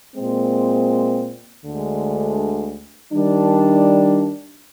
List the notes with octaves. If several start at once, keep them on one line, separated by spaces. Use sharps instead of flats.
A#2 G#3 C4
D2 D3 G#3
D#3 G3 D4